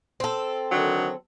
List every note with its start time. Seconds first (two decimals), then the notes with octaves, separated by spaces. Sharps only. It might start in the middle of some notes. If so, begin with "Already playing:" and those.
0.20 C4 A4
0.71 D3 D#3 F#3